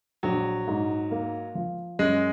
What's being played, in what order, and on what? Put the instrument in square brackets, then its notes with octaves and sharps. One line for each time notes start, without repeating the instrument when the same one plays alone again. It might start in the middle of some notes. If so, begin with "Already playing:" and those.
[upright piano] A#1 [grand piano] F#3
[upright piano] G#2
A#3
F3
[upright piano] F#2 [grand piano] G#3